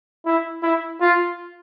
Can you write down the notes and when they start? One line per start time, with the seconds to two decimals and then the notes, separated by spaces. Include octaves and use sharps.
0.26 E4
0.63 E4
1.01 F4